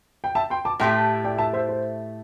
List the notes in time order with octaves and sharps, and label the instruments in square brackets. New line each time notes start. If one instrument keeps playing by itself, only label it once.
[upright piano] G5
E5 A5
G5 C6
A5 D6
[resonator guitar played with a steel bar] A2 A3 E4 G4 [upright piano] G5 C6
[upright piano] D5 G5
E5 A5
C5 E5
C5